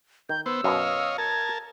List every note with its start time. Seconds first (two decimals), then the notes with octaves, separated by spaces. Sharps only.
0.29 D#3 G6
0.46 B3 C5 E6
0.64 F#2 B2 C#5 D#5 F5
1.18 A#4 A5 G#6